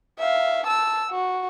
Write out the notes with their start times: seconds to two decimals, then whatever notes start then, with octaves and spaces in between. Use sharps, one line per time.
0.19 E5 F5
0.66 A5 E6
1.10 F#4